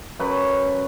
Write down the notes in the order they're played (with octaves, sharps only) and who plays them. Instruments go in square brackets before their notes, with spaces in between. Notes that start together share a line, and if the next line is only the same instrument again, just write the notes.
[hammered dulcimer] F#2 B4